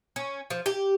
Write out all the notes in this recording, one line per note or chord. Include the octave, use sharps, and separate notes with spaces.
C#4
F3
G4